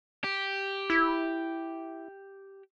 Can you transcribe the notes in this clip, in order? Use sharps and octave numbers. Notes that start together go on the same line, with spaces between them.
G4
E4